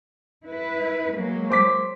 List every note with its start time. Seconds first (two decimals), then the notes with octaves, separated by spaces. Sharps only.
0.44 E4 B4
1.12 F#3 G#3 A#3
1.50 C5 D6 B6